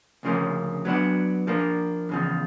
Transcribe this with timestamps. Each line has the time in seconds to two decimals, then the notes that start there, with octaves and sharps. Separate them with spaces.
0.23 D2 C#3 F3 A#3 C#4
0.85 F#3 B3 D4 F#4
1.47 F3 A#3 D4
2.09 E2 C#3 F3